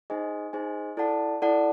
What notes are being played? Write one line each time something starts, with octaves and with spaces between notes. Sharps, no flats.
D#4 G#4 C5 D#5 G#5
D#4 G#4 C5 D#5 G#5
E4 A4 D5 F#5 A5
E4 A4 D5 F#5 A5